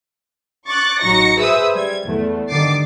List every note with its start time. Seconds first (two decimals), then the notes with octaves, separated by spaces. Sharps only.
0.68 C#6 D6 F#6 A6
1.00 A1 F#3 D#4 C#6 A#6 C#7
1.39 G#4 B4 C5 E5 D#6 E6
1.75 G3 G#6
2.06 E2 A3
2.48 G2 D3 D#3 D6 A6 C7